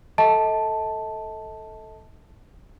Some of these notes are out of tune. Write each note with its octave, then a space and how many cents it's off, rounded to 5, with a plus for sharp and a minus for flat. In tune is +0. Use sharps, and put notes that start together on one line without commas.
A4 +5 D#5 +40 A5 +0